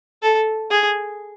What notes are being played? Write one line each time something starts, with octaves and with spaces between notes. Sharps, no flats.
A4
G#4